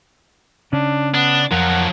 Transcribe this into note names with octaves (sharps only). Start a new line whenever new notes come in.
C#3 C#4 D4
B3 D4
F2 F3 F#3 A#4 F#5